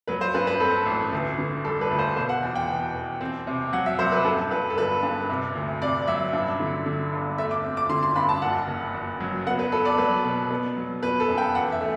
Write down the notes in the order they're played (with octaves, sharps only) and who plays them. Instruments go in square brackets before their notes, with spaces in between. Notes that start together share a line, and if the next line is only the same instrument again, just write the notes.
[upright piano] F#3 B4
C5
G2 B4
B4
C4 A4
A1
D2
D3
G3 A4
B4
D2
C5
B2 C5
F#5
E2
G5
B2
E2
C4
C3
F#3 F#5
E5
F#3 C5
B4
G2 A4
G2 B4
A4
G1 B4
G2
C3
D2
C3 D5
F#3 E5
G2
D3
D3
G1
A3 E5
D6
C4
D6
D3 C6
C6
G2 B5
A5
F#1 F#5
F#1
F#1
F#3
B3 F#5
B4
B3 A4
D5
F#3 B4
B2
B3
F#3
B3 B4
A4
F#2
G5
E2 F#5
E5
A3